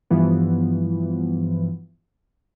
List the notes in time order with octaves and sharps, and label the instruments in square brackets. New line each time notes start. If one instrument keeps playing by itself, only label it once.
[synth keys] G2 E3 F3 B3